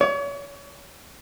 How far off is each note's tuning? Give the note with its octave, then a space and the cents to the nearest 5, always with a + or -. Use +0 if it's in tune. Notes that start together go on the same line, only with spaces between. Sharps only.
C#5 +35